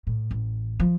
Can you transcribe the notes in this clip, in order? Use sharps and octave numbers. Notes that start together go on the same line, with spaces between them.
A2
A1
F3